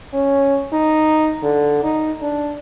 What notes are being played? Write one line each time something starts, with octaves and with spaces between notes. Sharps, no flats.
C#4
D#4
D3
D#4
D4